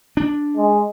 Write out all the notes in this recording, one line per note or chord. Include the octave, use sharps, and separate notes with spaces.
D4
G#3